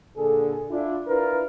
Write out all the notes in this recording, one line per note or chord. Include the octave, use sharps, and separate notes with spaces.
A#2 D3 D4 G#4 A4
D4 E4 F4
D4 E4 F4 A#4 B4